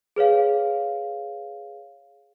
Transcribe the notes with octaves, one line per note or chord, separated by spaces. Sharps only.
G#4 B4 C#5 F5